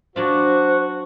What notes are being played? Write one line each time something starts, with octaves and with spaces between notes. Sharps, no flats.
F#3 D4 F4 F#4 C5